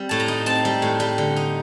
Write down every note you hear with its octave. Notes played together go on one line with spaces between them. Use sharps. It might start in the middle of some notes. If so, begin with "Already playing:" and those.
Already playing: G3 C4
A2 A5
A#5
D#4
C4 A5
G3
A2
G3
D3
D#4